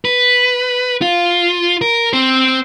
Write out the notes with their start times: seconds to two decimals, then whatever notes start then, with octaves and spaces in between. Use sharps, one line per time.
0.05 B4
1.01 F4
1.81 A#4
2.13 C4 C5